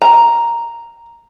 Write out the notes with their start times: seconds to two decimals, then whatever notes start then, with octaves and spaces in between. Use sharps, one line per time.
0.02 A#5